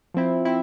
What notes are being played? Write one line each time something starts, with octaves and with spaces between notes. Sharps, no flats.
F3 C4 E4
C4 E4